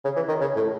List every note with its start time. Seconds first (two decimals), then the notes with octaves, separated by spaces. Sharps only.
0.05 C#3
0.16 E3
0.28 D#3
0.41 C#3
0.56 A2